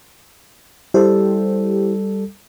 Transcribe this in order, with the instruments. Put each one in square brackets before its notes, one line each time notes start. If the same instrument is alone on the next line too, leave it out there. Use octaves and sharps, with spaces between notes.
[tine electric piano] G3 A4 [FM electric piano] E4 G4 C5